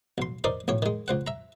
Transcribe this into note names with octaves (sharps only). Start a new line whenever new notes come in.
B1 C6
D#4 A#4 C5 D5
B1 A2 C#5
D#3 G#3
C#2 C5 F#5
E5 A#5